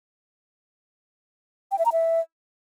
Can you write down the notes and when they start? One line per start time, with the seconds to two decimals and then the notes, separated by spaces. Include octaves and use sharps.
1.71 G5
1.78 E5
1.85 A#5
1.92 E5